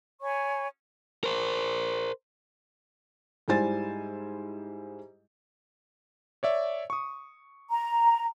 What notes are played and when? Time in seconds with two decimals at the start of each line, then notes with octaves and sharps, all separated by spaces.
0.22 C#5 G#5 B5 C#6
1.24 A#4 C5
3.48 G#2 G3 E4 C5 G#5 A6
6.43 C#5 D5 E5
6.90 C#6 D#6
7.72 A#5